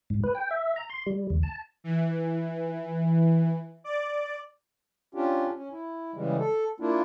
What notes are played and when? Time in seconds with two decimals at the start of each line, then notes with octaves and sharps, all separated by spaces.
0.10 G#2
0.24 B4
0.35 G5
0.51 E5
0.76 A#5
0.90 C6
1.06 G3
1.30 D#2
1.43 A5
1.84 E3
3.84 D5
5.14 C#4 D4 F4 G4
5.55 C#4
5.72 E4
6.14 C#3 E3 G3 G#3
6.39 A4
6.80 A#3 D4 E4 F4